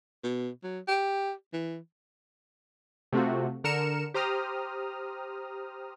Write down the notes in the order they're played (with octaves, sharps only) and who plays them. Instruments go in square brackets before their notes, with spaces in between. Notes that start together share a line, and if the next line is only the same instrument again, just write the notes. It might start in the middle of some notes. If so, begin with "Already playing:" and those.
[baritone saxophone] B2
F#3
G4
E3
[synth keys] C3 A3 C4 F4 F#4
D3 A#4 F6 C#7 E7
G4 C5 A#5 D#6 F6